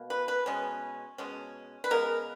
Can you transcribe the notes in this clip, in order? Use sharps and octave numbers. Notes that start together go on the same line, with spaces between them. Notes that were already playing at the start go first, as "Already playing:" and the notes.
Already playing: B2 A#3
B4
B4
B2 G#3 C#4
B2 G#3 C#4
B4
C#3 G#3 B3 A#4